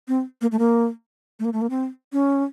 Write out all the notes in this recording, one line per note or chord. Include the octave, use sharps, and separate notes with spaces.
C4
A#3
A3
A#3
A3
A#3
A3
A#3
C4
C#4